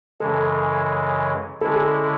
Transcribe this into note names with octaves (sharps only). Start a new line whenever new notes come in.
F#2 C#3 E3 G#3 A4
D3 G#3 C#4 E4 A4
G#4
A4